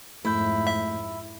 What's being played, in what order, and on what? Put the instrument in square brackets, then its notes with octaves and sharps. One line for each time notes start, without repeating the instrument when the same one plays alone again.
[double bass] F2 G#2 [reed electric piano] A3 G6 [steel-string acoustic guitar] E4
[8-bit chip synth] E5